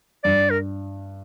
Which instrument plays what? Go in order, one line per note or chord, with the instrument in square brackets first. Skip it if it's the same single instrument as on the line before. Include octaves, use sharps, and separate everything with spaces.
[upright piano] G2 [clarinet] D5
[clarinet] A#4